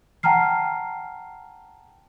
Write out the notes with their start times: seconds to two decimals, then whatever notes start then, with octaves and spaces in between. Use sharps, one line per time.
0.23 F#5 G5 A5 A#5 F6 C7